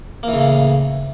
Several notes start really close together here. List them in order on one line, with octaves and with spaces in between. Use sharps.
A#3 E3 C#3 A2